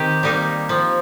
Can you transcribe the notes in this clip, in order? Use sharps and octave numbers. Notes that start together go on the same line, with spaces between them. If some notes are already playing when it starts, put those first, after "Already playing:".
Already playing: D#3 C4 G4
G3 A#3 D#4
F3